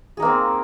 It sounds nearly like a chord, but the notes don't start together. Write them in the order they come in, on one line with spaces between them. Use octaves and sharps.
G#4 D#4 A#3 C4